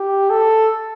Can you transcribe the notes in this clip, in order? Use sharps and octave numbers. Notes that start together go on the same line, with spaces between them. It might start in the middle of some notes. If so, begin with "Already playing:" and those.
Already playing: G4
A4